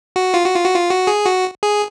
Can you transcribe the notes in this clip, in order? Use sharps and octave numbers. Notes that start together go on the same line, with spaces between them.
F#4
F4
F#4
F4
F#4
F4
F#4
G#4
F#4
G#4